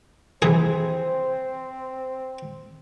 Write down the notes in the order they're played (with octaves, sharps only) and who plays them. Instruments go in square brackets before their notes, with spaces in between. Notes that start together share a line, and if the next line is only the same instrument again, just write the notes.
[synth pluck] C3 E3 [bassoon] C4 [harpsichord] G#4 [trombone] C5